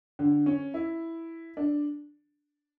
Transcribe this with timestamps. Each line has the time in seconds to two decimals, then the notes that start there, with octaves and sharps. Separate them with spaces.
0.19 D3
0.46 C#4
0.74 E4
1.57 D4